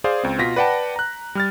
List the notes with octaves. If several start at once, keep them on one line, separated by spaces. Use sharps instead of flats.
G#4 C5 D5 F5
C#2 C4
B2 F4 A#6 B6
B4 D5 F#5 G5 A5
A#5 F#6
G3 F6 A6